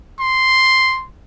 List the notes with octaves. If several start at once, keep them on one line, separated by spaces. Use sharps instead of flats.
C6